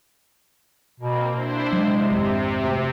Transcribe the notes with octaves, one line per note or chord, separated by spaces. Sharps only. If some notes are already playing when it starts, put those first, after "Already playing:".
B2 A#3 C4
B2 D4 E4 C5
C3 F#3 G#3
G#1 F2 G#2
D2